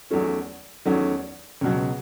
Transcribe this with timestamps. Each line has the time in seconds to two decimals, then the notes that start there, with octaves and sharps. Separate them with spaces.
0.10 E2 D#3 F#3 A3 C#4
0.85 E2 D#3 F#3 A3 C#4
1.61 C#2 B2 F#3